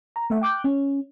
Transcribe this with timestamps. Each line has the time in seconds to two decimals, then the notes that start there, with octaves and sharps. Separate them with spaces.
0.16 A#5
0.30 A3 E5 F#5
0.41 G5 D6 F#6 G6
0.64 C#4